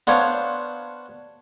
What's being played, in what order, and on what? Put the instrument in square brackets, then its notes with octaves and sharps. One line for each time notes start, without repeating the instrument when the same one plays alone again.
[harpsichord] B3 D4 C5 C#5 F5